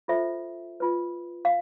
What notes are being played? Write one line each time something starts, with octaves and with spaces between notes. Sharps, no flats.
F4 A4 C5 E5
F4 B4
F5